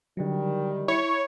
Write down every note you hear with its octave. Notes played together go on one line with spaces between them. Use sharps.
D3 D#3 F#3 G3
E4 C#5 B5